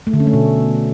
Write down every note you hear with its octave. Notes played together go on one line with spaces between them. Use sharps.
A3
D3
C#4
A3
B2